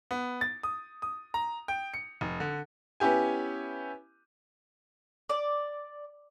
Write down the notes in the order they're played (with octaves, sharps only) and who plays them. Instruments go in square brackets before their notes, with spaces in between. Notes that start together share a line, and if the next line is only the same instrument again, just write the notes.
[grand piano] B3
A6
D#6
D#6
A#5
G5
C#7
F1
D3
[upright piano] B3 C#4 E4 G4 G#5
[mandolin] D5